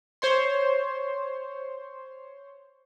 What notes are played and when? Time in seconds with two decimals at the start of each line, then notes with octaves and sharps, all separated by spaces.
0.22 C5 C#5 C6